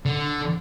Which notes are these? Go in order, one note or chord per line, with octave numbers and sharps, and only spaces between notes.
D3